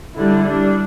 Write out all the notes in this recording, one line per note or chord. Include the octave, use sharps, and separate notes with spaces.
D3 G3 D4 E4
G3 D4